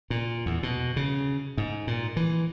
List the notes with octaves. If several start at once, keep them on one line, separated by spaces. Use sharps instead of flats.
A#2
E2
B2
C#3
G#2
A#2
E3